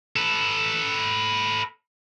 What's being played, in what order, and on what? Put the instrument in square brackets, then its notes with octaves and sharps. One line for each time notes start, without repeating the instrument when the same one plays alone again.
[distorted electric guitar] A4 B4